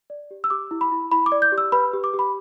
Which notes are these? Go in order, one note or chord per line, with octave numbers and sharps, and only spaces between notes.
D5
G4
E6
G4 D6
E4
B5
E4
E4 B5
D6
D5
G6
G4
E6
B4 B5
G4
D6
G4
B5